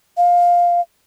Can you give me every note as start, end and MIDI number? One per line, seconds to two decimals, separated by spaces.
0.17 0.81 77